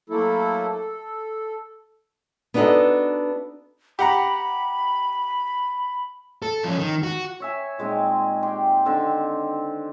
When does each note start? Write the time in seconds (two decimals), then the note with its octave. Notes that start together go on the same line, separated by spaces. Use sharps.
0.10 F#3 A3 A#3 E4 A4
0.70 A4
2.54 B3 D4 D#4 F#4 A4 D#5
3.99 G4 F#5 A#5 B5
6.42 A4
6.64 F3 C#4
6.79 D#3
7.03 F#4
7.40 C#5 E5 G#5
7.79 A#2 G#3 C4 D#4
8.42 G4 G5 C6
8.85 D3 D#3 C4